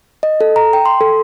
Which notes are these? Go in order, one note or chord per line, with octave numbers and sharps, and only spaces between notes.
D#5
A4
A#5
G5
C6
A4